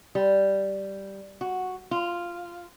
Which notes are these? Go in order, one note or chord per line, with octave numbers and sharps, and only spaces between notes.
G3
F#4
F4